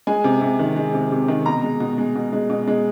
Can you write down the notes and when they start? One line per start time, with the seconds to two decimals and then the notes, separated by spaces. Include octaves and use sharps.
0.07 G#3 G#5
0.24 C3
0.42 C3
0.59 D#3
0.76 G#3
0.94 C3
1.11 C3
1.28 D#3
1.46 B2 A#5
1.63 G#3
1.80 B2
1.98 G#3
2.15 B2
2.33 G#3
2.50 B2
2.68 G#3